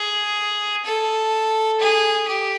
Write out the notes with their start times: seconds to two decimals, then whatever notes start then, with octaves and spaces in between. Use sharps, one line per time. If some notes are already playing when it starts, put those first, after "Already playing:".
Already playing: G#4
0.85 A4
1.80 G#4
2.28 G4